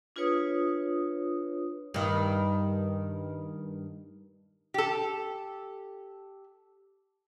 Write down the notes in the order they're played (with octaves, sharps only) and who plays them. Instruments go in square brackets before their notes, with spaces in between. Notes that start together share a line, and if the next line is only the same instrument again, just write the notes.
[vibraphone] D4 F4 G#4 B4 C#5 D#6
[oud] G2 D#3
[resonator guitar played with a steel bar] G4 A4